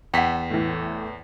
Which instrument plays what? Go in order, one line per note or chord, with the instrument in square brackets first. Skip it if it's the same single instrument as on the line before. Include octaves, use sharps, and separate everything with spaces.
[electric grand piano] E2 B6 [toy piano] F#5 G5
[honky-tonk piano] A2 E3